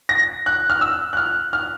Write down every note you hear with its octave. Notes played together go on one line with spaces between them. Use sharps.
A#6
F#6
F6
E6
F#6
F6
F6